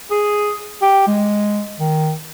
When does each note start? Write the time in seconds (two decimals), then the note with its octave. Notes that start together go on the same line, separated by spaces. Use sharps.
0.11 G#4
0.82 G4
1.07 G#3
1.80 D#3